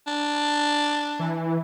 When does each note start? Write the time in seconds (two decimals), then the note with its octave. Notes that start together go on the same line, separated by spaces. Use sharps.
0.07 D4
1.19 E3